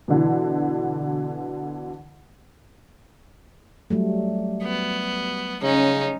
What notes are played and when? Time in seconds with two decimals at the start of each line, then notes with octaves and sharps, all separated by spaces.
0.08 B2 D3 E3
3.90 F#3 G3 A3
4.63 B3
5.62 C#3 C#4 D#4